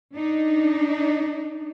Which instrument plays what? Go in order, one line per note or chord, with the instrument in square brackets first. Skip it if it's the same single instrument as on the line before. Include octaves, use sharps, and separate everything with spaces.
[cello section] D4 D#4